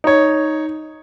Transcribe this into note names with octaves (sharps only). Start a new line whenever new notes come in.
D#4 C#5